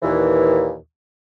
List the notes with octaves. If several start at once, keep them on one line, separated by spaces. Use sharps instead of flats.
D#2 A#2 E3